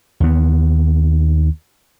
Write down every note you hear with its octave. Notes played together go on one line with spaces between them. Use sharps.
D#2 B3